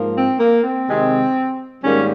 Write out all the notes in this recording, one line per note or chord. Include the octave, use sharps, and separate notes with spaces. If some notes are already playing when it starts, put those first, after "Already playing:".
Already playing: G#2 F3 A#3
C4
A#3
C4
C3 D#3 G#3
G#2 D#3 G3 A#3 C#4